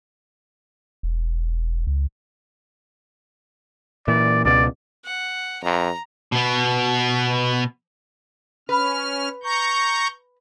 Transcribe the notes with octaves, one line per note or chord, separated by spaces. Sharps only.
E1
C#2
A#2 E3 D5
C#2 B2 D5
F#5
F2 A#5
B2 B3
C#4 B4 F6
A#5 C#6 G6